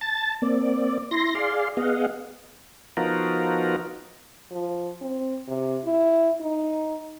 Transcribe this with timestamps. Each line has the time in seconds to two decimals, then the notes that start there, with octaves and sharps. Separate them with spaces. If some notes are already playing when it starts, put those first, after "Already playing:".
0.01 A5 A6
0.42 A#3 C4 D5
1.11 E4 C6 A#6
1.35 G#4 D5 F5 C6
1.77 B3 G#4 D#5 F5 F#5
2.97 F3 B3 D#4 F4 F#4 A#4
4.51 F3
5.01 C4
5.48 C3
5.85 E4
6.40 D#4